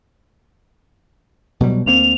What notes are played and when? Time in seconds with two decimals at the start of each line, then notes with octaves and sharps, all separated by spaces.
1.61 B2 F#3 G3
1.86 D2 A#3 C4 F7